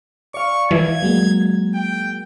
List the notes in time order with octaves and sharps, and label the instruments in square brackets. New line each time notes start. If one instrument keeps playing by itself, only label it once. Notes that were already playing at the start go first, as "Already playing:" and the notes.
[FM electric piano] D5 F5 [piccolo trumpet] C#6
[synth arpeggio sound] E3 [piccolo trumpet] G#6
[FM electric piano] F#3 G#3 A#3
[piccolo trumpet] G5